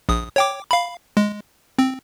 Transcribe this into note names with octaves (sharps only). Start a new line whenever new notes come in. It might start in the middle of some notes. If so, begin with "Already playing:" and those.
A#1 D#6
C#5 G5 D6
F5 B5
G#3
C4